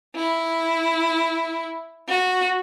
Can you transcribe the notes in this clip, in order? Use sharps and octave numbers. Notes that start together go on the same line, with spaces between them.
E4
F#4